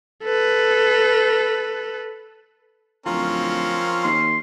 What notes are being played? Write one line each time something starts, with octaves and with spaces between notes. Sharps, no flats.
A4 B4
D1 F3 C4 C#4 F4 A#4
D#2 C6